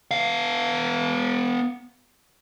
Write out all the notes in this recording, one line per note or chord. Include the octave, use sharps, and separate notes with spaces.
B3 F5